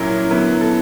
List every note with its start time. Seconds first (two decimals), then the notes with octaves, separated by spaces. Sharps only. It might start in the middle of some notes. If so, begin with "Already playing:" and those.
Already playing: A#2 F#3 A#3 C#4 E4 A#4
0.31 D3 F#3 B3 E4
0.61 A4